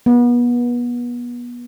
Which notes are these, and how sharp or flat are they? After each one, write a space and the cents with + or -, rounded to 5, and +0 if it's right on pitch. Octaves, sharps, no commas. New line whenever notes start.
B3 -30